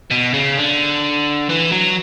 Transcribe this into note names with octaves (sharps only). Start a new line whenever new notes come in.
B2
C#3
D3
E3
F#3